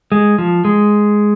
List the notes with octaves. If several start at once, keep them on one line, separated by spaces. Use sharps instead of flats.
G#3
F3
G#3